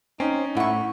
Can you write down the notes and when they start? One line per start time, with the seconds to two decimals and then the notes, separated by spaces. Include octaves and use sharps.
0.20 C4 C#4 D#4
0.57 A2 E4 F#5 C#6